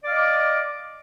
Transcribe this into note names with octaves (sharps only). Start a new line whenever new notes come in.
D5 D#5 F5 D6